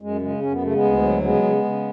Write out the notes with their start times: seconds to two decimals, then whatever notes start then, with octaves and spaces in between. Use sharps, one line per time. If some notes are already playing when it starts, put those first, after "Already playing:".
0.02 F#2 G#3
0.21 C#3 G#3
0.42 F#2 C#4
0.52 B3
0.62 C#3 A3
0.74 G#3 B3
0.83 D2
1.02 F#3
1.23 C#3 G#3 B3
1.43 C#3
1.64 C#3